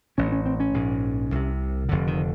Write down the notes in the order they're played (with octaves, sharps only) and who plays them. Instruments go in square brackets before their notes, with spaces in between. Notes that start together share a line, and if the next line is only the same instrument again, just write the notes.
[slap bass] A1 A2 C#4
C#4
C4
C#4
A#1 G#2
C2 C3
F1 F2 D3
D#3